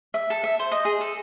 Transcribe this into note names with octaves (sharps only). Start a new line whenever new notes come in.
E5
A4
E5
C5
D#5
G#4
A4